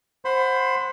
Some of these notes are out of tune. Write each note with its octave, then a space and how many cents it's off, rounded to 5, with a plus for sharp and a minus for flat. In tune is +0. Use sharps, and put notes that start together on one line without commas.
C5 +10 F#5 -10 B5 +30